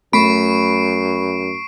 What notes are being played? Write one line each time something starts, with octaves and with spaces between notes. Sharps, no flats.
F#2 A3 B5 C#6 C7 D7